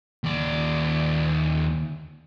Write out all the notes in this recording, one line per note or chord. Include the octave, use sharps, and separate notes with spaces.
D#2 D5